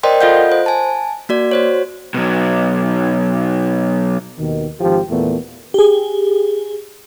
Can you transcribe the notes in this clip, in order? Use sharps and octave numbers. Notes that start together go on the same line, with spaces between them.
A#4 C5 D5 D#5 G5 C6
F4 A4 D#5 F5 F#5 G6
C5
G#5 A5
A#3 F#4 D5
F#4 C5 C#5
B2 F#3
D#2 B2 D#3
G#1 F3 G4
E2 A#2 A3 B3
G4 G#4